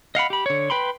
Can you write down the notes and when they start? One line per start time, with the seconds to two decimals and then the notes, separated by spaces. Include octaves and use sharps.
0.15 D#5 F5 F#5 B5
0.30 G4 B5
0.46 D3 C#5
0.70 B4 G5 B5 C6